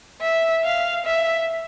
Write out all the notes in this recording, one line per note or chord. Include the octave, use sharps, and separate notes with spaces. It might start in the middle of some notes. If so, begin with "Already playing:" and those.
E5
F5
E5